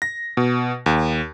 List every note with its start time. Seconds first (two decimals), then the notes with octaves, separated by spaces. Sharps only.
0.02 A#6
0.37 B2
0.86 D#2